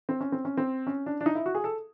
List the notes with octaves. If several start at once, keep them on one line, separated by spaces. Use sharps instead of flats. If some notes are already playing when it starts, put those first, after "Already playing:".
C4
C#4
C4
C#4
C4
C#4
D4
D4
D#4
E4
F#4
G#4
A4